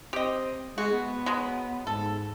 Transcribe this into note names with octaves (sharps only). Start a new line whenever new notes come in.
C4 G4 D#5
G#3 F#4
B3
F#3 G#3
G#2 A4